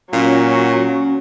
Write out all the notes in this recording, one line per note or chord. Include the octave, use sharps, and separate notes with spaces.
A#2 F#3 C#4